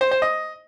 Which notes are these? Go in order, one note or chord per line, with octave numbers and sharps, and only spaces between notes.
C5
C5
D#5